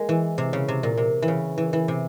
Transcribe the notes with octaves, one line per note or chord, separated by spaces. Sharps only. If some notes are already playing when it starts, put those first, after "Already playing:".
Already playing: G#3 A#3
E3
C3
C#3
C3
A#2
C3
E3
C#3
E3
E3
C3